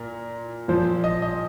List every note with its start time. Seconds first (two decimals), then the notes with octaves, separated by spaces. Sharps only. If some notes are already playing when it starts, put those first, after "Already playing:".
Already playing: A#2 A#4
0.68 A#2 F3 C5
1.04 D#5
1.22 D#5